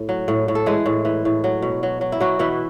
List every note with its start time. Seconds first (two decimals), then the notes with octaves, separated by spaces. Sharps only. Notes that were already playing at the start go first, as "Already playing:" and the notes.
Already playing: A2
0.09 F#3
0.28 A2
0.48 A2
0.55 A4
0.66 E3 G#3 G#4
0.86 A2
1.05 E3
1.25 A2
1.44 F#3
1.62 B2
1.83 F#3
2.01 F#3
2.12 E4
2.20 B2 F#3 F#4
2.39 B2 E3 E4